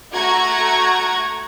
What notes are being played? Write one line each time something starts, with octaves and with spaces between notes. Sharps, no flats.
A3 F#4 F#5 A#5 C#6 G#6